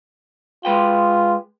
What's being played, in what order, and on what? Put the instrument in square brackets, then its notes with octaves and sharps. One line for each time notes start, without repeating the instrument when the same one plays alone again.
[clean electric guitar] G#3 B4 G5 [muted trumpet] F4